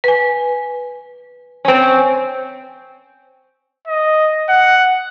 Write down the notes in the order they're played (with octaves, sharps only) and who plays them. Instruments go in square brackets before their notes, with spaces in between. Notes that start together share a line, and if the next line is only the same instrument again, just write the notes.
[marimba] B4 G#5
[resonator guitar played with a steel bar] C4 C#4
[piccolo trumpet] D#5
F#5